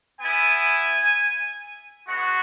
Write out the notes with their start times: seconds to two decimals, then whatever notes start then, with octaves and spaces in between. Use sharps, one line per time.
0.21 B3 E4 G#5
2.08 G#3 B3 F#4